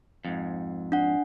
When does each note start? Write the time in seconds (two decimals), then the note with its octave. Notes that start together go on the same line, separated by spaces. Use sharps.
0.25 F2 G#2
0.92 D4 F#5